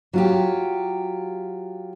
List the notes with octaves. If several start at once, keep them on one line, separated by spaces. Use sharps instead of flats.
F#3 F4 G4